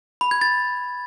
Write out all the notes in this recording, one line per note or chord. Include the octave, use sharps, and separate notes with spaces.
B5
G#6
A6